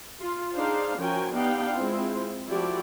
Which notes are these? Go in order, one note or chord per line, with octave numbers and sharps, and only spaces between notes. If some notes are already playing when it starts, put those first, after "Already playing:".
F4
D4 D#4 G#4 C5 F5
F3 C#4 F#4 A#4 G5 G#5
B3 D4 D#4 G4 F5 G5
G#3 C4 E4 F4
F3 A3 E4 F#4 G4 D5